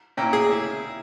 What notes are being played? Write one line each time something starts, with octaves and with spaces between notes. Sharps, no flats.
A#2 A#3 C#4 E4 G5
G#4
E4